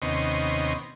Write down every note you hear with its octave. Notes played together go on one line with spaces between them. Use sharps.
D#2 C3 B3 C#4 D#5 C6